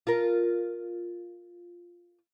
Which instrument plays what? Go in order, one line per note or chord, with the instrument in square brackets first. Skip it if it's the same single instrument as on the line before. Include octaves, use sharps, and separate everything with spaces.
[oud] F4 A#4